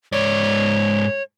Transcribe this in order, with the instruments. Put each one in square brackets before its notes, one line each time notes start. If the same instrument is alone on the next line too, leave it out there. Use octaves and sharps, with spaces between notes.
[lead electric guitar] G#2 D5 [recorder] C#5